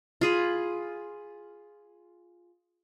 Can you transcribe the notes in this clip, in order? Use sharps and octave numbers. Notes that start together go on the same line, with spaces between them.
F4 G#4 B5